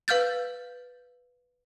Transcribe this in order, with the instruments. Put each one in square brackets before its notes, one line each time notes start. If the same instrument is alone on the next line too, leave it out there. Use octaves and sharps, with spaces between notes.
[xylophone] B4 F5 F6 G6 A6